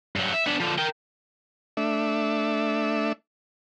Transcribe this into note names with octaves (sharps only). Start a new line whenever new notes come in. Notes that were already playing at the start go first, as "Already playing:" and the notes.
G2 F#3
E5
B3 D4
D3 F3
A#4 G5
A3 D4 E5